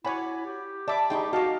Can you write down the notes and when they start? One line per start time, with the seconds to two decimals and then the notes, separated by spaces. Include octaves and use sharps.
0.05 E4 F#4 C#5 D5 G#5 B5
0.45 G4
0.88 D5 E5 A5 B5 D6
1.10 D#4 F4 G4 G#4 G5 B5 C#6
1.33 F#4 G4 A4 D#5 F5 A5